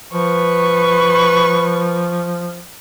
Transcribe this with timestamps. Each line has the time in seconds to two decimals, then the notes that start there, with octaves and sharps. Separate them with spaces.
0.13 F3 B4 C#6